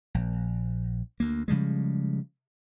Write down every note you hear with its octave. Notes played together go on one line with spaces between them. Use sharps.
A#1
D2 A#3
C#3 F3 G3 G#3